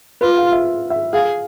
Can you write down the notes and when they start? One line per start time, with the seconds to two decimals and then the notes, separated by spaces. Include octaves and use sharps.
0.21 F4 B4
0.37 F5
0.52 E5
0.90 E5
1.13 G#4 F5